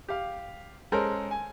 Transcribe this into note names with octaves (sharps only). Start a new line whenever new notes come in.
G4 F5
G#3 C#4 A4 A#4 C5
G#5